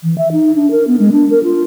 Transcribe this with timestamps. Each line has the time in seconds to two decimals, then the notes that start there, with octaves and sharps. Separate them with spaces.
0.04 E3
0.18 E5
0.32 D#4
0.56 D4
0.71 A#4
0.87 B3
1.00 G#3
1.12 D4
1.31 A#4
1.43 F4